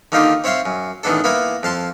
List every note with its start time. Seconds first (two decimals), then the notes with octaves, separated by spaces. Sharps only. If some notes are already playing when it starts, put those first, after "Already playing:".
0.12 D3 D#3 A#3 D#4 F4 G4
0.44 C4 C#5 E5 F5 C6
0.66 F#2
1.03 A1 D#3 B3 D4 A4
1.24 A#3 B3 E4 A#4 G#5
1.63 F2 F5 A5 C6